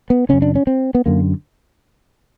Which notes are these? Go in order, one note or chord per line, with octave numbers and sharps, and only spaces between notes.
B3
F#2 C#3 C#4
D4
C#4
C4
B3
F#2 D3 A#3